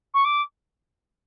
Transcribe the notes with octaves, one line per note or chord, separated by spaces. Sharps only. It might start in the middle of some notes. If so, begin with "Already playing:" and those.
C#6
D6